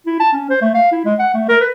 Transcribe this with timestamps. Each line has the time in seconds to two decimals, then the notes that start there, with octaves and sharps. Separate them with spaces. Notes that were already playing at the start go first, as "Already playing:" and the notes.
0.07 E4
0.20 A5
0.33 C#4
0.50 C5
0.62 A3
0.74 F5
0.92 E4
1.05 G#3
1.19 F#5
1.34 A3
1.49 A#4
1.61 B4